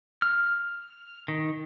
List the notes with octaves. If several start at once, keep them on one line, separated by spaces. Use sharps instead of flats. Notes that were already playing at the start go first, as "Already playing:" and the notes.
F6
D#3